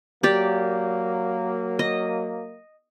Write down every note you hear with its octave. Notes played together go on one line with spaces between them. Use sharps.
F#3 A#3 G4 D5
D#5